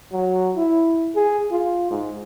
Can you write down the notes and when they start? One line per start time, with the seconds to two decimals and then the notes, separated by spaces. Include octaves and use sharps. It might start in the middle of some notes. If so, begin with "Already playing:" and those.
0.12 F#3
0.56 E4
1.15 G#4
1.51 F4
1.91 G#2